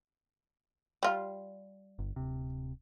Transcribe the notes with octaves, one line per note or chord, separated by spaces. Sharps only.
G3 F4
G1
D1 C3